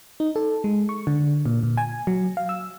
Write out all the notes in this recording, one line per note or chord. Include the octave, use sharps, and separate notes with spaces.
D#4
A4
G#3
C#6
D3
A#2
A#2
G#5
F#3
F5
E6